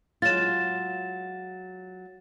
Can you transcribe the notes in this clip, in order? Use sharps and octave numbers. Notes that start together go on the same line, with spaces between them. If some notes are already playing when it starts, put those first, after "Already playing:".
F#3 G#3 F4 A6 E7